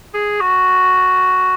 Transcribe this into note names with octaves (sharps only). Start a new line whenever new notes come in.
G#4
F#4